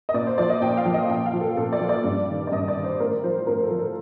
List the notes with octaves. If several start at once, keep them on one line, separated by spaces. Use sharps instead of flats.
D#5
A#2 D5
C5
F3 D5
D#5
A#2 G5
F5
F3
D#5
A#2 G5
F5
F3
A4
A#2 A4
D5
F3
D5
G2
D#3
D5
G2 D#5
D5
D#3
C5
A2 A#4
F3 C5
A2 A#4
A4
F3
A4